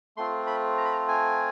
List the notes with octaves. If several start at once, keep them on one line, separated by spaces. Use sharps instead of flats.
A3 C4 F4 C6
B5
A#5
B5
A#5
G#5